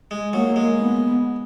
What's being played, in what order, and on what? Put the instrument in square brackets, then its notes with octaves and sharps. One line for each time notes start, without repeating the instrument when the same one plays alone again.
[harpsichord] G#3
[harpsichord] F#3 [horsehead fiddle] A#3
[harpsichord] G#3
[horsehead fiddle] B3